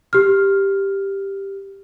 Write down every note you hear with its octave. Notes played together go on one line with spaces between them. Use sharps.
G4 F6